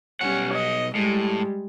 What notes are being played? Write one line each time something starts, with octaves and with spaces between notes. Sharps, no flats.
B1 G3 C#4 F#5
D#5
A2 G3 G#3